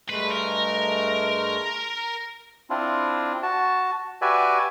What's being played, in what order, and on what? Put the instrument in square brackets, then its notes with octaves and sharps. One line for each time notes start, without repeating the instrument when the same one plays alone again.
[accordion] G2 G#3 A3 [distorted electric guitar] B4
[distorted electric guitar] A#4
[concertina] C4 D4 E4 F4
F#4 A5
F#4 G4 B4 D5 E5 G#5